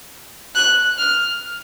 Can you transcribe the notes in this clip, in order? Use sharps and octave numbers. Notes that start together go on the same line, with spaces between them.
F#6
F6